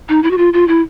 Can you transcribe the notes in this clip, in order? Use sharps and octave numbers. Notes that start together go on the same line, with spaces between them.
D#4
E4
F#4
F4
F4
E4